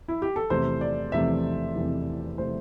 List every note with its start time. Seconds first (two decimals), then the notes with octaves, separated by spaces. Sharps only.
0.08 E4
0.22 G4
0.36 A4
0.50 E2 C3 A3 C4 C5
0.81 D5
1.12 E2 C3 A3 C4 E5
1.76 E2 C3 A3 C4
2.38 C3 A3 C4 C5